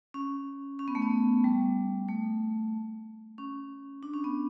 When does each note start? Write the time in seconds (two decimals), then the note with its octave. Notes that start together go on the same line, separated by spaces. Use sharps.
0.14 C#4
0.79 C#4
0.88 B3
0.95 A3
1.02 B3
1.44 G3
2.08 A3
3.38 C#4
4.03 D4
4.14 C#4
4.24 B3